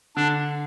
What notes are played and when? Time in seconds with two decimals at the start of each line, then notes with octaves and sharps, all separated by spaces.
0.16 D3 D4